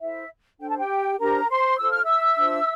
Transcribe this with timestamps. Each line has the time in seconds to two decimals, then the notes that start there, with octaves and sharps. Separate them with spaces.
0.01 E4 A4 C5 E5
0.60 D4 A4 C5 G5
0.69 A5
0.78 G4 G5
1.19 D4 G4 A#4 C5 A#5
1.49 C5 C6
1.79 F4 A4 C5 E6
1.91 F6
2.04 E5 E6
2.38 D4 F4 C5